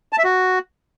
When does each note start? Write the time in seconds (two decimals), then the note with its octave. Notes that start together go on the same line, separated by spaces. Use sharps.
0.13 A5
0.18 E5
0.24 F#4